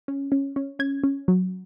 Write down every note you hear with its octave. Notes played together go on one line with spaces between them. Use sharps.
C#4
C#4
C#4
C#4 G#6
C#4
F#3